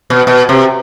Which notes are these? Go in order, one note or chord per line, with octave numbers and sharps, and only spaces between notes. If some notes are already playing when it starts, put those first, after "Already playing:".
B2
B2
C3